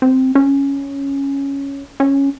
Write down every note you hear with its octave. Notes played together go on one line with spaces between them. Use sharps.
C4
C#4
C#4